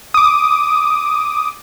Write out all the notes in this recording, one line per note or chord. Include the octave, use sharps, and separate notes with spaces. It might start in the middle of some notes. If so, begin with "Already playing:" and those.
D6 D#6